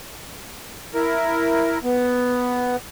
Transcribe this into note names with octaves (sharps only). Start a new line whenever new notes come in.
E4 A#4
B3